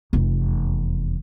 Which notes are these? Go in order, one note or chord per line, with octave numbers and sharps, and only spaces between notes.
F1 E2